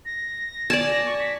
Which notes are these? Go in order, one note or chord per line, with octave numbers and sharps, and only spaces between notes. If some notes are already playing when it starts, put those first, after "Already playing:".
A#6
D5 G#5 A5
C#6
B6